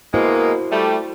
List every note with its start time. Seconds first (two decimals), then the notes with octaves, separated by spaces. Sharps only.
0.14 B2 G#3 A#3 E4 F#4 C5
0.72 G3 A3